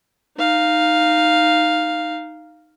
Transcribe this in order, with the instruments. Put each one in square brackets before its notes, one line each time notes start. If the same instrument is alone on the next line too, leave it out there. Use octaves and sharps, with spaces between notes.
[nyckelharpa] D#4 F5